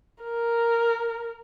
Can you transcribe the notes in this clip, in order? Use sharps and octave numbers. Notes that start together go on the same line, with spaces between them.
A#4